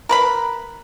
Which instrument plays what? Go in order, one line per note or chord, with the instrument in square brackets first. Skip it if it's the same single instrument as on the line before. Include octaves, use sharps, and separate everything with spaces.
[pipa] A#4 B4 B5